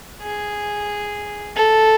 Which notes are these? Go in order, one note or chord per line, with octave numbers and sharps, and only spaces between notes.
G#4
A4